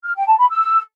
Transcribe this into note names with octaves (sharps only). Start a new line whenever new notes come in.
F6
G5
A5
B5
E6